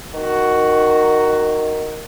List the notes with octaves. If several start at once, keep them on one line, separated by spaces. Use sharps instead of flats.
D#3 F#4